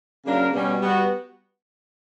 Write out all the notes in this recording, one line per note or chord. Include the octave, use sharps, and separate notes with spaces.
C#3 F#3 A#3 D4 A#4
B2 G3 C#4
G3 B3 F#4